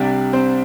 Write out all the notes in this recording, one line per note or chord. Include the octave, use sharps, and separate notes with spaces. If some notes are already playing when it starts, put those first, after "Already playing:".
Already playing: C2 C3 G3 D4 D5
C4 C5